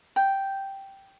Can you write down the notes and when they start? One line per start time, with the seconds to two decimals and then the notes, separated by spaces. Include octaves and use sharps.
0.16 G5